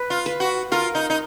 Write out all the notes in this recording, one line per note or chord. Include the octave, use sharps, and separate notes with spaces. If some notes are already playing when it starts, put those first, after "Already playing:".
Already playing: B4
F4
B4
F#4
F4 A#4
D#4
D#4